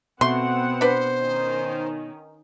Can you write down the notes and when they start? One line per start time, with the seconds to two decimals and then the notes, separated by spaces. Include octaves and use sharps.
0.21 B2 A3 B3 C4 F#5 C6
0.81 D4 B4 C5
1.17 D#3 C#4 D#4